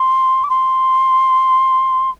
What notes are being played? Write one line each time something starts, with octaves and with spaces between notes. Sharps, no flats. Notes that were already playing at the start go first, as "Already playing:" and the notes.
Already playing: C6
D6
C6